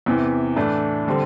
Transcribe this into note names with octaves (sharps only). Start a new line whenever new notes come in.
E2 C3 E3
A2 E3 A3 D4
D3 G3 C4